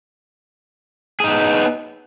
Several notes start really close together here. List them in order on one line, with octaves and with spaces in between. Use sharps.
G#4 D#4 B3